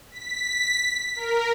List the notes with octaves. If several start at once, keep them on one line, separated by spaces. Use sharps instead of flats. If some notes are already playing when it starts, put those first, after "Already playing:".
B6
A#4